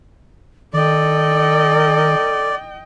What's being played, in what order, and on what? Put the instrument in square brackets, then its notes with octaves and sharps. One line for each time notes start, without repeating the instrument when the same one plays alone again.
[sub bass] D#3 [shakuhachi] A4 [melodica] D5 [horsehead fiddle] D#5 G5